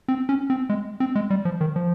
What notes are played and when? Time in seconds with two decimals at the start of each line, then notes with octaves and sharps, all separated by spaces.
0.08 C4
0.29 C#4
0.50 C4
0.69 G#3
1.00 C4
1.15 G#3
1.30 G3
1.45 F3
1.61 D#3
1.76 F3